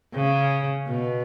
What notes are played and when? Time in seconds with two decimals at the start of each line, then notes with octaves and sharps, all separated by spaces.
0.15 C#3
0.87 B2